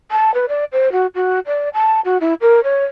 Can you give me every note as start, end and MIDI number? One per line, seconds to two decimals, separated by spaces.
0.11 0.33 81
0.34 0.45 71
0.48 0.64 74
0.72 0.91 72
0.92 1.06 66
1.15 1.39 66
1.46 1.69 74
1.74 2.00 81
2.04 2.17 66
2.20 2.34 64
2.41 2.60 70
2.63 2.84 73